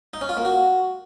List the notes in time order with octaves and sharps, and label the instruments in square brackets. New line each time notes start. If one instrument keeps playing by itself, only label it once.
[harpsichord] D#4
C#4
F4
A#3
F#4